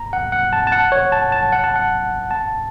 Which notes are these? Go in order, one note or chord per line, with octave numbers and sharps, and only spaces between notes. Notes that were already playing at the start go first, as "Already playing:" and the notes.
Already playing: A#5
F#5
F#5
A5
A5
F#5
C#5
A5
A5
F#5
A5
F#5
A5